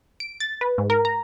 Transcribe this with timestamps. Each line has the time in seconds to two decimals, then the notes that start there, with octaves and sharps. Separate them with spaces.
0.20 D7
0.40 A6
0.61 B4
0.78 G#2
0.90 A#4
1.05 A#5